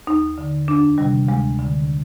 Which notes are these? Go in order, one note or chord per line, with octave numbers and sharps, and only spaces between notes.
D#2 D#4
D3
F2 D4
C3 D#3 G3
D2 G#3
D3